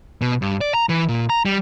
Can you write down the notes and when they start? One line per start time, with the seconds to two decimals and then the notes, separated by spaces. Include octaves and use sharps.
0.22 B2
0.42 G2
0.61 D5
0.74 A#5
0.89 E3
1.09 A#2
1.30 A#5
1.46 G3